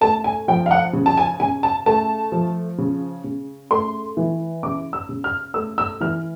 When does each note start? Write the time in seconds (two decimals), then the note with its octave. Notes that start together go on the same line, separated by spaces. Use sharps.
0.01 A3 A5
0.24 G#5
0.48 F3 G5
0.66 F5
0.71 F#5
0.93 C#3
1.06 A5
1.17 G#5
1.40 C#3 G#5
1.63 A5
1.86 A3 A5
2.32 F3
2.78 C#3
3.24 C#3
3.71 A3 C6
4.17 E3
4.63 C#3 D6
4.93 E6
5.09 C#3
5.24 F6
5.54 A3 E6
5.78 E6
6.01 E3 F6